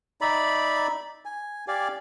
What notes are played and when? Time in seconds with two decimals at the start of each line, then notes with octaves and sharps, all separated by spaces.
0.21 D#4 D5 E5 B5
1.25 G#5
1.68 G4 D5 F5 G#5